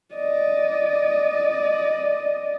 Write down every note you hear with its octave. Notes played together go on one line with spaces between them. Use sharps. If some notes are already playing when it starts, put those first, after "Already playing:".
D5 D#5